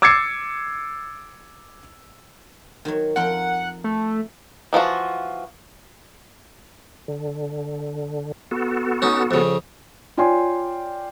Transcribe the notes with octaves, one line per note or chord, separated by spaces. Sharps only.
D6 E6 G#6 A6 C7 C#7
D#3 F#3 C#5
F2 A#4 F#5 G5
A3
E3 F3 F4 F#4
D3
B3 F#4 A4
C#4 D#4
F2 C#3
F4 C#5 D5 G5 G#5 C6